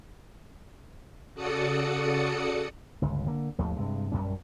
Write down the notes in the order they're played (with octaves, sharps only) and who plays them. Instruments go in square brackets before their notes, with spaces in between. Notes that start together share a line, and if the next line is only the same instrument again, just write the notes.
[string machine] C#3 F#4 A4 D5 D#6 C#7
[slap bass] G1 C#2
D3 A#3
G#1 D#2 F3 A3
G2 C3 G#3
A#1 F#2 G3 C#4